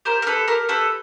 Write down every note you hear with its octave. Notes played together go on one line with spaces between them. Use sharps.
G4 A#4 C5
A#4
G4 A4 B4
G4 A#4
G4 A4 B4